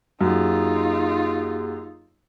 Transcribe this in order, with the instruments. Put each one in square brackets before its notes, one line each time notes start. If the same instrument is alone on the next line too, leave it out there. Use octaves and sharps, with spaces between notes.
[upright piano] F#2 [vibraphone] A#3 G4 G#4 [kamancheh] D#4 F4